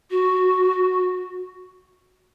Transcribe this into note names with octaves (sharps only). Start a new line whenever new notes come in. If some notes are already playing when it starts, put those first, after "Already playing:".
F#4